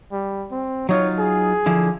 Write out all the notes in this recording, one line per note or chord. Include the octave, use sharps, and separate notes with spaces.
G3
C4
F#3 D#4 F4 C#5
G#4
D3 F3 E4